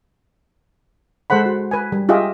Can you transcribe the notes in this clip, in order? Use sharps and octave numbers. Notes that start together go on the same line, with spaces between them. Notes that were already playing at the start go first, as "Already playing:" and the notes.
G#3 A4 C5 F#5 B5
F#4
B4 G#5
G3
F4 G4 G#4 D#5 E5